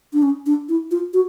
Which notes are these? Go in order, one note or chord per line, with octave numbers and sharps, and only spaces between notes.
D4
C#4
D4
E4
F4
F#4